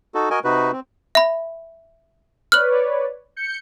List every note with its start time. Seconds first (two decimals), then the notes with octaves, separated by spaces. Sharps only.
0.15 D#4 F#4 A4
0.30 F#4 A#4 D#5 G#5
0.44 C3 D#4 F#4 B4
0.72 C4
1.15 E5 B5
2.52 B4 C#5 D5 F6 F#6 F#7
3.36 G6 C#7